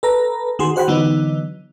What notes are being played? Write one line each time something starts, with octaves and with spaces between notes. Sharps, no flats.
A4 B4 A#5
D#3 F#4 G#4 C6
F#4 C5 F#5 G5 B5
D3 E3 F#3 B3 D#4